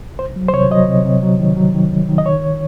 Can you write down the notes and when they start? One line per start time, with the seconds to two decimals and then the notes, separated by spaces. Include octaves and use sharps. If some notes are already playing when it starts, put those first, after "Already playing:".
0.19 C2 C5
0.36 F#3
0.48 C5
0.53 C3 C#5
0.71 F#3 D#5
0.88 C3
1.05 C3
1.23 F#3
1.39 D#3
1.57 F#3
1.74 D#3
1.92 C2
2.09 D#3
2.18 D#5
2.26 C#2 C#5